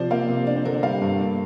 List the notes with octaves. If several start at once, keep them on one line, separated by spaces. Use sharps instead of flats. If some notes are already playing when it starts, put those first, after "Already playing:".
Already playing: C3 F3 C5 D5
A#3 F5
C3
D4 D5
C5
D3 A#4
D5
G3 F5
G2
A#3